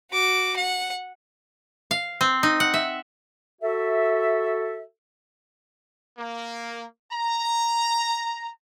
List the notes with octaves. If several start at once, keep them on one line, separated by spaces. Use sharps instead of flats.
F#4 D6
F#5
F5
C4
D#4
F#5
E5
F#4 A4 E5
A#3
A#5